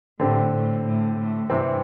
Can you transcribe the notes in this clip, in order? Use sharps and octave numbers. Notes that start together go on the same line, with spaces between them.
A2 D3 C4 G4
A2
A2
A2
G2 C3 E3 C4